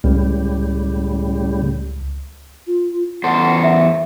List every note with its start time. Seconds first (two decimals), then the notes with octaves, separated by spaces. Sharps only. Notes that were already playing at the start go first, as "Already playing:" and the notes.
0.04 C#2 A2 C#3 G3
2.67 F4
3.24 E2 A4 C5 F#5
3.64 E5